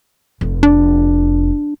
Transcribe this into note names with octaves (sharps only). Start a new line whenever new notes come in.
F1
D4